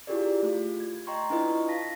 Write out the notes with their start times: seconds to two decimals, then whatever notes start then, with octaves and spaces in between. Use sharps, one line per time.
0.07 E4 F4 G4 G#4 A#4 D5
0.43 A3 F4
0.80 G#6
1.07 D#5 G5 A#5 C6 C#6
1.30 D4 E4 F4 B4 D#5
1.68 F5 A5 A#6 B6